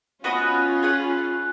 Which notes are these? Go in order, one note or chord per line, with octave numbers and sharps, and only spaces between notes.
B3 C#4 F4 F#4 B4 D#5
G#4 B4 F#5